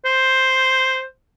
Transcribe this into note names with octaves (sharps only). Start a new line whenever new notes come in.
C5